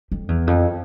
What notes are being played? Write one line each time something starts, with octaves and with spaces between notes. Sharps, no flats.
F2
E2
F2